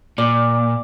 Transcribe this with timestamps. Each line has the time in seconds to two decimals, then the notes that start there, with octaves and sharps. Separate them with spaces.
0.18 A#2 D5